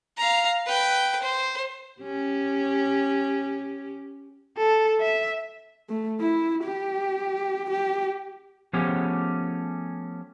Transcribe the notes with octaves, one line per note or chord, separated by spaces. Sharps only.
F5 A#5
B4 G5
C5
C#4 G4
A4
E5
A3
E4
G4
G4
F3 A3 B3 C#4 G4 G#4